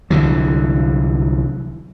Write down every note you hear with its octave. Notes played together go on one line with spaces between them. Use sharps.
C2 D3 E3 F#3